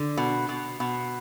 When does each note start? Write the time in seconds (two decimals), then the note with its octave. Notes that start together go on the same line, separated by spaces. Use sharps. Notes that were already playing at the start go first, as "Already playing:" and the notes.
Already playing: D3
0.17 B2
0.49 B2
0.80 B2